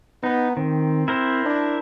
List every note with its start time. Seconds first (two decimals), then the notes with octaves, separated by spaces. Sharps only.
0.23 B3 D#4
0.57 D#3 C4
1.08 E4 A#4 C5
1.46 D4